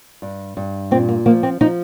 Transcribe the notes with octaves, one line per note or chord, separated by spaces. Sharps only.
G2
G2
A#2 C4
A#3
F3 A#3
C4
F3 D#4